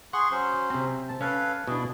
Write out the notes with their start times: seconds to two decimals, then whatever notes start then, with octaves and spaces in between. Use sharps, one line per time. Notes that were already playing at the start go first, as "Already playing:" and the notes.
0.13 G#4 F#5 C6 C#6
0.31 F#3 C#4 C5
0.70 C3 C4
1.08 A5
1.21 C#4 A4 B4 F5
1.67 B2 D4 E4 G#4